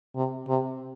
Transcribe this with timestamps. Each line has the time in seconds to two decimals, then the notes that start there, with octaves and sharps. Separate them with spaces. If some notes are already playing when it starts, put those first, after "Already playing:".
0.16 C3
0.48 C3